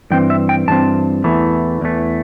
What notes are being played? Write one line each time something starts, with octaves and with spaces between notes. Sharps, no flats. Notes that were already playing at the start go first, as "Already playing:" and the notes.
G2 E3 C4 G5
E5
G5
G2 E3 C4 A5
E2 E3 A3
E2 E3 A3